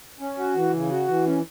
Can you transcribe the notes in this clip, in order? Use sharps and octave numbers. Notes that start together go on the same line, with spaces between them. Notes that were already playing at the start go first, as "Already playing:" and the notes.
C#4
F#4
E3
C#3
F#4
E3
C#4